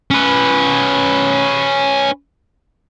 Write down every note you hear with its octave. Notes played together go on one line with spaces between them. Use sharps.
C#4 B4